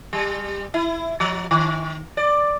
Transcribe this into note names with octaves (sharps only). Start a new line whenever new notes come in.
G3
E4
F3
D#3
D5